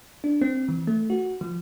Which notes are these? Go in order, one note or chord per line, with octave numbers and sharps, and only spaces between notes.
D4
C4
E3
A3
F#4
F3